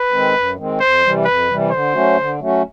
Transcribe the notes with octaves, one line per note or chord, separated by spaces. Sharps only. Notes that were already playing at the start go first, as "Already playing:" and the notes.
Already playing: B4
D#3 G#3 C4
F#2
D#3 G#3 C4
F2 C5
C3 E3 G3
F2 B4
C3 E3 G3
D3 C5
F#3 A3 C#4 F#4
D3
F#3 A3 C#4 F#4